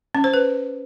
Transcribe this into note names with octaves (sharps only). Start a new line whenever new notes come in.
C#4
C5
B4